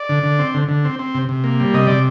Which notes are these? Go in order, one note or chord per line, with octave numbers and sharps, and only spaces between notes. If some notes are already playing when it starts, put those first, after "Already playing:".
Already playing: D5
D3
D3
C4
D3
D3
C4
C4
C3
C3
A#3
G3
C3 D#5
C3 D5